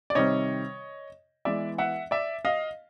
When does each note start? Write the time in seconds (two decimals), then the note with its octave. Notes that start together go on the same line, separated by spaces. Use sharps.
0.10 D5
0.15 C3 D#3 G3 C4 C#5 D#5
1.45 E3 G#3 B3 D5 E5
1.78 E5 F#5
2.11 D5 E5
2.45 D#5 F5